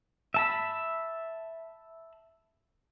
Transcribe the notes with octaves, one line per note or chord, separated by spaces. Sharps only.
E5 A5 B5